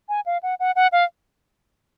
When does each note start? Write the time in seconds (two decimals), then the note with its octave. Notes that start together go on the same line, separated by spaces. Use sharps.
0.09 G#5
0.26 F5
0.43 F#5
0.60 F#5
0.76 F#5
0.92 F5